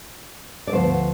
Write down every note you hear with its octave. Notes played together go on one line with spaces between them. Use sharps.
D5
D2 C3 F3 B3 C5